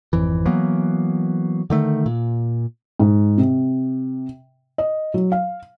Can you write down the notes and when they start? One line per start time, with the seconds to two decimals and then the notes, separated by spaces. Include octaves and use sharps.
0.13 G#1 F2 E3
0.45 E3 F#3 A#3 B3
1.70 D3 D#3 A3
2.06 A#2
3.00 G#2
3.38 C3
4.78 D#5
5.14 F#3
5.32 F5